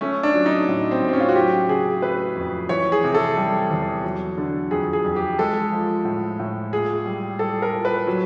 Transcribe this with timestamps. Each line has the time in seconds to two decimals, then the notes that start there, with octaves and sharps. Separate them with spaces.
0.01 A3 C#4
0.23 D4
0.34 F#3
0.46 D#4
0.68 A2
0.91 C4
1.02 A2
1.09 C4
1.13 C#4
1.20 F4
1.28 F#4
1.35 F#3 G4
1.68 C#3 G#4
2.02 A3 B4
2.36 F2
2.69 E3 C#5
2.92 G#4
3.04 C3
3.15 A4
3.37 G3
3.70 E2
4.03 F#3
4.37 D3
4.71 F2 G#4
4.93 G#4
5.05 F2
5.16 G4
5.39 G#3 A4
5.72 F3
6.05 A2
6.39 A2
6.73 A#2 G#4
7.06 G3
7.39 G3 A4
7.62 A#4
7.74 A#2
7.85 B4
8.07 F#3